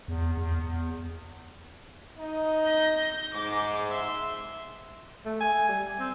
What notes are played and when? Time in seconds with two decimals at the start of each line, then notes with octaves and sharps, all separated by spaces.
0.08 E2
0.37 E2
0.59 E2
2.18 D#4 D#5
2.65 G6 A#6
3.34 G#2 D6
3.90 E5 C6
5.25 A3
5.40 G#5
5.68 G3
5.99 C4